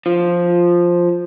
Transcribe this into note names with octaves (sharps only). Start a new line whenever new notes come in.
F3